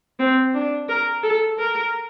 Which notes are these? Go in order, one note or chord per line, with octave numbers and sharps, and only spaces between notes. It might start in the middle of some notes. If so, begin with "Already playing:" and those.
C4
D4
A#4
A4
A#4